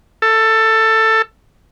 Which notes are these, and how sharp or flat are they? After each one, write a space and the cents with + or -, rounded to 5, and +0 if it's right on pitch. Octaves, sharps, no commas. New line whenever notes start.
A4 +15